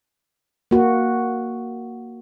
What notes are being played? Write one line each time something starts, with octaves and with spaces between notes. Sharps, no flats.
A#3 F#4